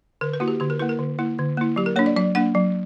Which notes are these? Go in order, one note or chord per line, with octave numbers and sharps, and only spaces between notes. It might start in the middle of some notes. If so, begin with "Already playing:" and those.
D3 A#4
B4
A#3 E4 F#4
G4
D3 G4
A#4
A#3 E4 B4
A#4
D3
A#3 E4
D3
A#3 E4
F#3 G4
A#4
A#3 D4 C#5
D5
F#3 D5
A#3 D4 F#5
F#3